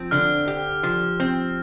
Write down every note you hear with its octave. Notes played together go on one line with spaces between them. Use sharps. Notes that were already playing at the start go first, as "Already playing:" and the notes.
Already playing: F3 C4
D3 F6
G4
F3
C4